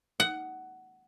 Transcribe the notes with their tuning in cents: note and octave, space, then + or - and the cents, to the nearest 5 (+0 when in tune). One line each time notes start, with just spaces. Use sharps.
F#5 +15